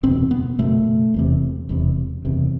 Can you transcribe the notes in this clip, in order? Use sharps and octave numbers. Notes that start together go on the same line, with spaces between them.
F#1 E2 B2 C4
B3
F#1 E2 B2 A3
E1 E2 C3
E1 E2 C3
F#1 E2 C3